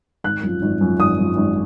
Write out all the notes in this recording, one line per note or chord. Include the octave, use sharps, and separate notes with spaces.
G#1 F#6
F#2 F3
G#1
F#2 F3
G#1 D#6
F#2 F3
G#1